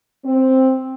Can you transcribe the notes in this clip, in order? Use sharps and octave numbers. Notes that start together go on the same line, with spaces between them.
C4